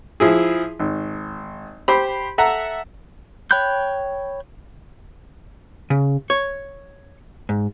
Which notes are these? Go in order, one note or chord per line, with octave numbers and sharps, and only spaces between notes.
F3 E4 G#4
G#1
G4 C5 B5
A4 E5 F#5 A#5
C#5 G5 B5 F#6 G6
C#3
C#5
G#2